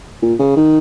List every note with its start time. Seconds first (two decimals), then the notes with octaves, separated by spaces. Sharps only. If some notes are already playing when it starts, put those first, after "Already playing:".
0.22 A#2
0.39 C#3
0.56 D#3